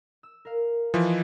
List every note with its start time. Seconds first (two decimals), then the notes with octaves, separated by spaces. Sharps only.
0.23 E6
0.45 A#4 F5
0.94 E3 F3 D#5 F#6